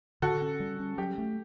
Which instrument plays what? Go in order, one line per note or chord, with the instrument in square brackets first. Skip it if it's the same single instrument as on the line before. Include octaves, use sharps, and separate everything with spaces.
[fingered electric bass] D3 [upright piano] F#4 A4
[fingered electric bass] C#4
G3
C#4
[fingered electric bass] F#3 [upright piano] G4
[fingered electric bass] A3